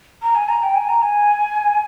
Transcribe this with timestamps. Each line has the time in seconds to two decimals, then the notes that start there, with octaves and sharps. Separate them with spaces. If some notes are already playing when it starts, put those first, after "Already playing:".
0.22 A#5
0.35 G#5
0.49 A#5
0.62 G5
0.75 G#5
0.89 A#5
1.02 G#5